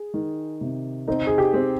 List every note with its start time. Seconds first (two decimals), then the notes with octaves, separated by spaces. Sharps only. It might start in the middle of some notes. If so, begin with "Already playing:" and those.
Already playing: G#4
0.14 D#3
0.61 C3
1.08 C4 D#4
1.27 G#4
1.38 G4
1.54 C4